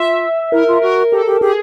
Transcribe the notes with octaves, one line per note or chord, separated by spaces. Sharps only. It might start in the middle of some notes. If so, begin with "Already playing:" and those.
Already playing: F4 E5
E4 A#4
F4
F#4 A#4
G4 A4
G4
G4 G#4